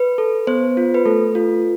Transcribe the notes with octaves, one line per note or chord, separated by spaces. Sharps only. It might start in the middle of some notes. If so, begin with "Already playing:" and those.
Already playing: B4
A4
B3 C5
F4
B4
A3 A4
F4